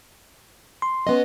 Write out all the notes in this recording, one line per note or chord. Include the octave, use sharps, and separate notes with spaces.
C6
B3 C#4 D#5